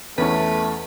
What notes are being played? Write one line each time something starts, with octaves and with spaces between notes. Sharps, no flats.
E2 A3 C#4 B4